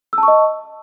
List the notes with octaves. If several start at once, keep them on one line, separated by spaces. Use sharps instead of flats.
D#5 A5 C#6 E6